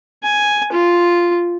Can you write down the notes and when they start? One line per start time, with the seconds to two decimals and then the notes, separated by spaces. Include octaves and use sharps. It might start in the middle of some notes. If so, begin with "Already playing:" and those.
0.24 G#5
0.72 F4